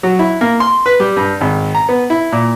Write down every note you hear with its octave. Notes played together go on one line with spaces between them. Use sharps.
F#3
E4
A#3
C6
B4
G3
G2
G#1
A#5
B3
E4
A#2